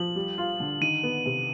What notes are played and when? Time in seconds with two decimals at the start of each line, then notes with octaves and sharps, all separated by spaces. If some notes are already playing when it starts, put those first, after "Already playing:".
Already playing: F3 F#7
0.16 G3
0.38 F4
0.60 D3
0.81 D#3 D#7
1.03 B3
1.26 C3